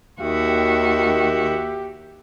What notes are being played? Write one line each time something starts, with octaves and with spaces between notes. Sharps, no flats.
D#2 D#3 F#4 G4 E5